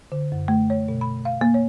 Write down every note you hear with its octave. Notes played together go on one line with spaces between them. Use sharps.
D3
F#2
A3
C#5
B2
B5
F5
A#3
C#5